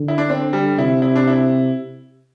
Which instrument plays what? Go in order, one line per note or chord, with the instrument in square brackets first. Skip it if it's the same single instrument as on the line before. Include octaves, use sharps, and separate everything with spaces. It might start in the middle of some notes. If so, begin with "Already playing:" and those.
Already playing: [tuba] D3
[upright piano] E4
D4
C4
G3
[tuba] C3 [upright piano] E4
[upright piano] E4
D4
E4